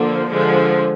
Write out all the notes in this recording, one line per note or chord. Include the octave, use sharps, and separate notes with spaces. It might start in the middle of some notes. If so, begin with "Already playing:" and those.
Already playing: D3 F3 A#3
D3 F3 G#3